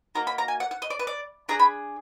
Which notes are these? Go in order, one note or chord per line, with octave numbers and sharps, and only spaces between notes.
A#3 D#4 F#4 A#5
B5
A#5
G#5
F#5
F#5
D#5
D5
B4
D5
D4 G#4 A#5
B5